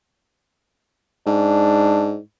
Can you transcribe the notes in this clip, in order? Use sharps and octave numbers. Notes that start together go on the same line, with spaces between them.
G#2 D4